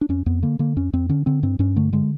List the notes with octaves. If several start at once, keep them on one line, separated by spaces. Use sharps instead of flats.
D4
F2 C#4
F2 B3
D3 A#3
D3 A#3
F2 C#4
F2 C4
D3 C#4
D3 C4
G2 C4
G2 C#4
D3 A3
D3 G#3